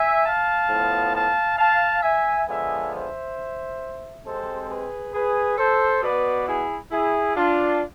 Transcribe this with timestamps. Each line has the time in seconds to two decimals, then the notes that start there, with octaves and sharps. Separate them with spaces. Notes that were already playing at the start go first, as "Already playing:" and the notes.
Already playing: E5 G#5
0.26 F5 A5
0.70 A2 F3 B3
1.15 F5 A5
1.59 F5 A5
2.03 E5 G#5
2.47 D3 F3 G#3 B3 E5 G#5
2.93 C5 E5
4.25 C3 G#3 C4 A4 C5
4.70 G#4 B4
5.14 G#4 B4
5.58 A4 C5
6.02 B2 B3 B4 D5
6.47 E4 G#4
6.92 E4 G#4
7.36 D4 F4